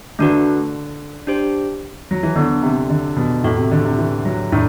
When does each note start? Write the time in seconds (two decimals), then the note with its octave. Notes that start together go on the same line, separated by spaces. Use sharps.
0.19 D3 A3 D4 F#4 B4
1.27 D4 G4 C5
2.11 F#3
2.23 E3
2.35 D3 B3 D4 A4
2.63 C3
2.89 D3
3.16 B2
3.44 A2 A3 C4 F#4 A4
3.58 C3
3.71 D3
3.85 C3
3.98 E3
4.25 F#3
4.52 A2 A3 D4